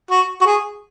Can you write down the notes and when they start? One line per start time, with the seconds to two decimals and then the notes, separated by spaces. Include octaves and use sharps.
0.10 F#4
0.41 F#4
0.46 G#4